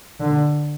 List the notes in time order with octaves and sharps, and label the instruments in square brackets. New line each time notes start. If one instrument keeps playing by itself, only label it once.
[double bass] D3